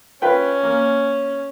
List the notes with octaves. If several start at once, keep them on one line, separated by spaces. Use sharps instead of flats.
C#4 F4 B4 G5
A#3